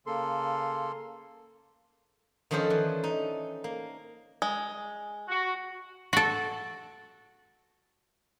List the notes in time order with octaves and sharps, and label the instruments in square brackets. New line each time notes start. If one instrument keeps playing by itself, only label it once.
[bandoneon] C#3 A#3 A4 C6
[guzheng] D#3 F3 C#4 D4 A4 C5
E3
D#4
A#3
[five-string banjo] G#3
[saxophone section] F#4
[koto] F#4 A4